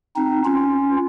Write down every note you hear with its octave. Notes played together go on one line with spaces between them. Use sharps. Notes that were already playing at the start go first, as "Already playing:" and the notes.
C4 D#4
C#4 F4